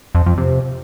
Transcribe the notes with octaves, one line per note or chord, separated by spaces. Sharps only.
F2
F2
C3